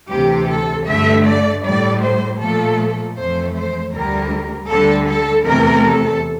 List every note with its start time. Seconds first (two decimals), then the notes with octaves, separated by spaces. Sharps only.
0.10 D2 C3 E3 G4
0.49 A4
0.87 G2 D3 A3 E5
1.25 D5
1.64 A2 G3 D5
2.02 C5
2.40 A#2 F3 A3 A4
3.17 F2 E3 A3 C5
3.55 C5
3.94 D2 D3 G3 A#4
4.70 D2 D3 G3 A4
5.08 A4
5.46 E2 C3 E3 A3 A#4
5.85 A4